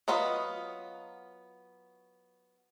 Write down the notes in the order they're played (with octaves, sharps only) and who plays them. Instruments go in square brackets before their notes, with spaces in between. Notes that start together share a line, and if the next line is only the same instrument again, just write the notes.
[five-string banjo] F#3 B3 F4 D#5